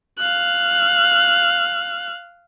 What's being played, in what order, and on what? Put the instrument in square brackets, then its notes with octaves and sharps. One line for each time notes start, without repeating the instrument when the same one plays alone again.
[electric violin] F5 F#6